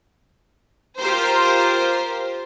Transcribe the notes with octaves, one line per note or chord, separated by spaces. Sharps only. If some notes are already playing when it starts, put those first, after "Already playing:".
F4 G4 A#4 C5